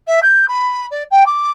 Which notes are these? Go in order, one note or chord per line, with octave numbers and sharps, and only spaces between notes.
E5
G6
B5
D5
G5
D6